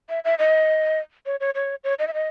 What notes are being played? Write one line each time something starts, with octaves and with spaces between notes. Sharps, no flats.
E5
E5
D#5
C#5
C#5
C#5
C#5
D#5
E5
D#5